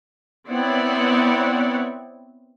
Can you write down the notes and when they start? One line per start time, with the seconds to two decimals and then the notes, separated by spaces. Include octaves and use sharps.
0.50 B3 C4 E4 C#5 D5 F#5